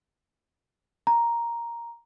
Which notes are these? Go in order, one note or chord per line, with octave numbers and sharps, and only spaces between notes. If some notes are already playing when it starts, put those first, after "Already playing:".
A#5